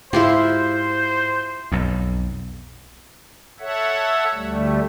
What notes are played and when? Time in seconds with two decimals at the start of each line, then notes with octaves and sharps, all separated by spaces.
0.13 G#2 E4 F4 G4 C5
1.72 B1 F2
3.60 A4 C#5 E5 F#5
4.34 D2 G3 A3